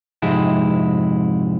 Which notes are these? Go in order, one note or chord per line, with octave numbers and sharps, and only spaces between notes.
F2 G#2 C3 G#3 E4